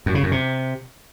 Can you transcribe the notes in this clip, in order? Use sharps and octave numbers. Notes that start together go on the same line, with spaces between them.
F#2
C#3
F#2
C3